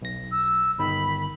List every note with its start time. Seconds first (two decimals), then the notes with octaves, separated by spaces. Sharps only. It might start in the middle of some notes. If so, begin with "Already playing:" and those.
0.02 B1 A#6
0.31 E6
0.78 G1 D#3 B5